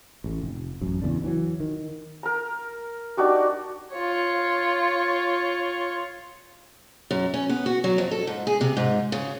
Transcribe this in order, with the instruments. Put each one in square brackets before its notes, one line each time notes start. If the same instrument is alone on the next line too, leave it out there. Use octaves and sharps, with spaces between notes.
[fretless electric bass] A1 A2
F1
A1 F#2
F#1 E2 C#3 D4
E3 F#3
D#3
[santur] A#4 A#5
D4 D#4 F#4 G4
[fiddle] F4 C#5
[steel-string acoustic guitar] F#2
C#4
B3
F#4
F#3
F2
A4
G#2
G#4
C3
G#2
C#3